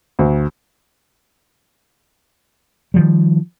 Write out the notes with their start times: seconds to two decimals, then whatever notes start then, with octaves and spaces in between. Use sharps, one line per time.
0.19 D2
2.94 D#3 F3 G3